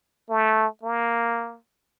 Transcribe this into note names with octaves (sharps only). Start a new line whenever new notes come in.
A3
A#3